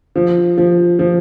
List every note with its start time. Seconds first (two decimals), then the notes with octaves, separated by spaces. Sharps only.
0.16 F3
0.58 F3
0.99 F3